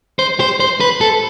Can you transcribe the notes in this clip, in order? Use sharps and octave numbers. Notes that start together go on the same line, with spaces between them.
C5
C5
C5
B4
A4